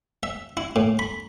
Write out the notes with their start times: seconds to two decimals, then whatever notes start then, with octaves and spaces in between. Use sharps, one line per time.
0.23 E5
0.57 E4
0.76 A2
0.99 B5